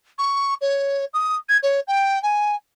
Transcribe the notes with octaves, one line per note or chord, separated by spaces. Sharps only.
C#6
C#5
D#6
G#6
C#5
G5
G#5